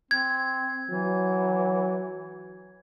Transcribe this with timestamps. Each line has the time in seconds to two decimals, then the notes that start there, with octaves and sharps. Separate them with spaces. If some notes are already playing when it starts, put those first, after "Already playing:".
0.11 C4 G#6
0.90 E3 F#3